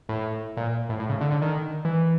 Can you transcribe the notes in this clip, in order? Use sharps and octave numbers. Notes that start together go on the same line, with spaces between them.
A2
A#2
A2
A2
C#3
D3
D3
D#3
E3